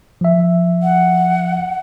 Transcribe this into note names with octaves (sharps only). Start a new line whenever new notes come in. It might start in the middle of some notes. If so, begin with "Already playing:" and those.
F3 E5
F#5